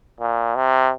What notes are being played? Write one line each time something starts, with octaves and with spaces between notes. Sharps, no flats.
A#2
C3